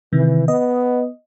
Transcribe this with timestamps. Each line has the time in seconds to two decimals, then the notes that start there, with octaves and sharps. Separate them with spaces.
0.13 C3 D#3 E3
0.48 B3 D#5